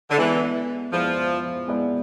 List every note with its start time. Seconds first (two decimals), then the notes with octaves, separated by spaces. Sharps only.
0.10 D3
0.17 E3 G#3 B3 E4 G#4 D5
0.92 F3 G#3 B3 E4 G#4 D5
1.68 G#3 B3 E4 G#4 D5